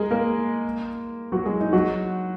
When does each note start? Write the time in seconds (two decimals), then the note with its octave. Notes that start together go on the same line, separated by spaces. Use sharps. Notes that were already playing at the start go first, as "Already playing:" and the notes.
Already playing: G#3 G#4 A#4
0.11 A#3 A#4
1.32 F#3 F#4
1.46 G#3 G#4
1.60 D#4
1.73 F#3 F#4